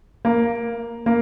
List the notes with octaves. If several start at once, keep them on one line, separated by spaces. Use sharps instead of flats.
A#3
A#3